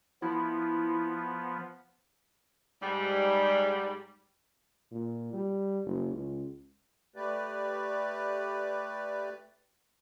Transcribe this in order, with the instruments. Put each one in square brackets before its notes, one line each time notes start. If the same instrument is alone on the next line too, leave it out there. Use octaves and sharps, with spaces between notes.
[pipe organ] F3 B3 [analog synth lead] E4
[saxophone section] G#2 G3
[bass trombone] A#2
G3
F#1
C#2
[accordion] A3 G4 B4 D5